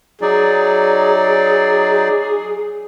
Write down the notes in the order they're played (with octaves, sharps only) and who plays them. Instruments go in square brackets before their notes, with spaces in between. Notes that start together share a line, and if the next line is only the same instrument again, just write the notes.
[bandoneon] F#3 D#4 D5 [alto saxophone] G#4